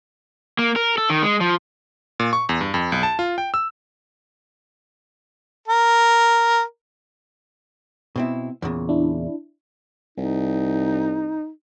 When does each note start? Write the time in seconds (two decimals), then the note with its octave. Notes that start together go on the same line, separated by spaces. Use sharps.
0.59 A#3
0.76 A#4
0.98 A4
1.10 D#3
1.23 G#3
1.41 F3
2.20 A#2
2.33 C#6
2.49 E2
2.61 G2
2.74 F2
2.92 B1
3.03 A5
3.19 F4
3.38 G5
3.54 E6
5.68 A#4
8.16 B2 C4 E4
8.62 E2 A#2 C#3
8.89 D4 E4
10.18 C2 D#4